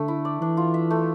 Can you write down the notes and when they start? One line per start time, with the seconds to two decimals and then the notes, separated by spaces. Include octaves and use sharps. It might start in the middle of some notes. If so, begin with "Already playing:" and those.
Already playing: D3 A3
0.08 E4
0.25 D5
0.41 E3 D4
0.57 F4
0.74 E5
0.90 A3